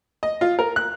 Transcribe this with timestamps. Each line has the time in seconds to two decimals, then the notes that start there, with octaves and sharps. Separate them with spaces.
0.23 D#5
0.41 F4
0.59 A#4
0.76 F#6